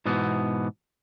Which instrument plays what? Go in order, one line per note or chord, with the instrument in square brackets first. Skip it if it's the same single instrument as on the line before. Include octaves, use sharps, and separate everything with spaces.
[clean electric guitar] G#2 B2 E3 B3